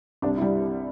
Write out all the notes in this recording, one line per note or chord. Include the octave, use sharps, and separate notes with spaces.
C2 D4
E4
G3